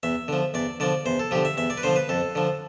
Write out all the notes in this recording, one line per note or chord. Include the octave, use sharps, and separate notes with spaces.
E2 E5
D3 F3
E2 D5
D3 F3 D5
E2 C5
A4
D3 F3 G4
E5
E2 E5
D5
B4
D3 F3 C5
B4
F2 A4
D3 F3